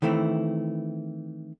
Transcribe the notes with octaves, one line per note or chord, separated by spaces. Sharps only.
D#3 E3 A3 C4 E4